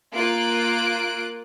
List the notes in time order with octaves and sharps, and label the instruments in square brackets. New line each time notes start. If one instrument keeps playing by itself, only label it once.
[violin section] A#3 F4 F#6 D7